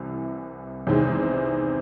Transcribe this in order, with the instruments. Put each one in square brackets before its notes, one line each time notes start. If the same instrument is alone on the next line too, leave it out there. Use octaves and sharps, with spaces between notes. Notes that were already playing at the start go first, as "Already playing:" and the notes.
Already playing: [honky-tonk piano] C2 C3 E3
E2 C3 D#3 G#3 C4